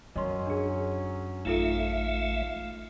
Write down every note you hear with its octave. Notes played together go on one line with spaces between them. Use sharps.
F#2 F#3 C#4 D#5 C6
D4 G#4
A1 A3 D#4 F4 A4 E5 F5